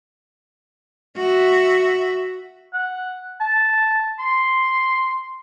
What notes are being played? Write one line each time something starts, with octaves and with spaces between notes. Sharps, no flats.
F#4 E5
F#5
A5
C6